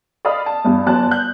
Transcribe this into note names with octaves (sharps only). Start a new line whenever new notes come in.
D5 D#5 F5 B5 D#6
A5
E2 G2 G3
G1 F#2 D5 A5 F#6
F#6 G6